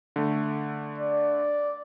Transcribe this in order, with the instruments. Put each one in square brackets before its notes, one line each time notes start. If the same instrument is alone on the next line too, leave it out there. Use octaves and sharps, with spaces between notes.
[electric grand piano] D3 A3
[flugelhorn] D5